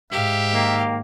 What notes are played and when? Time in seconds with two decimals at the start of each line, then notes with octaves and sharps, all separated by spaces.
0.12 G#2 G4 E5 F5
0.53 D#3 A#3